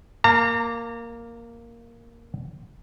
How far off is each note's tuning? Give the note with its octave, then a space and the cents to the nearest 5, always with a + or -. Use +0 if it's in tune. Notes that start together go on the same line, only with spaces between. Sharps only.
A#3 +0 A#5 -40